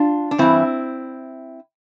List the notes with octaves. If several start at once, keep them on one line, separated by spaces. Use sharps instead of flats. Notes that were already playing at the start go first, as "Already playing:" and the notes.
Already playing: D4 F4
D4
G2 E3 C4 E4